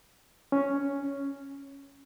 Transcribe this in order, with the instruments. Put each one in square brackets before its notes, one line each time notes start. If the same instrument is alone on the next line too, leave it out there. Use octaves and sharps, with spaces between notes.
[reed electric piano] C#4